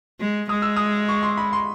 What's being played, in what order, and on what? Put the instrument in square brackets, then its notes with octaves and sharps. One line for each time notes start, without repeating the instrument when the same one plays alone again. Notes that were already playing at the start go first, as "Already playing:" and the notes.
[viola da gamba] G#3
[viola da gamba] G#3 [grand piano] D#6
[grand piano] E6
D#6
C#6
C6
B5
C6